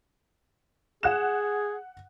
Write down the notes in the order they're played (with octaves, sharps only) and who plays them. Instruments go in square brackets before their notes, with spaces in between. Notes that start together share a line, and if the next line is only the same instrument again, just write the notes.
[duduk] G#4 [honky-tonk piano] F#5 F#6 E7